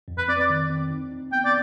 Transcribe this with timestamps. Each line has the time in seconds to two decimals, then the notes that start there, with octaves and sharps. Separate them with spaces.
0.08 F2
0.18 B4
0.28 C4 D5
0.39 D5
0.49 D#3
0.70 C4
0.90 D#4
1.11 D#4
1.32 B3 G5
1.45 D5